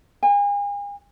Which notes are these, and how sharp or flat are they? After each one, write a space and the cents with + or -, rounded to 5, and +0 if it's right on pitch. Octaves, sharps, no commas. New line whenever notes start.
G#5 -40